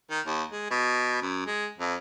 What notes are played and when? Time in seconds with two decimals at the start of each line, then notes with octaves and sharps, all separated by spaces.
0.11 D#3
0.26 D#2
0.52 G#3
0.71 B2
1.22 F#2
1.47 G#3
1.78 F2